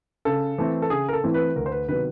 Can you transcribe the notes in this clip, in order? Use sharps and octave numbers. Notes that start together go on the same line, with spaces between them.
C#3 A4
E3 A3 C4 E4
A4
C#3 G#4
A#4
A4
E3 A3 C4 E4
B4
D2 A#4
C5
B4
C3 D#3 F#3 B3 B4